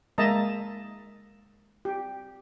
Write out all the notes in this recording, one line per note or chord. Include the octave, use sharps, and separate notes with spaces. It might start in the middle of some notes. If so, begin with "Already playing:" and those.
G#3 A#3 D#5 E5 A5 A#5
G4